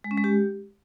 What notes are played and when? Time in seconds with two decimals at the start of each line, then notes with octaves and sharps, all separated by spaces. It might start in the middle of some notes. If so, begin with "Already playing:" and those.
0.04 G#3
0.11 C#4
0.17 G#3
0.24 G4